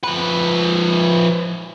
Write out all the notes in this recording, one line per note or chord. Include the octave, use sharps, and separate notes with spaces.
F3 B4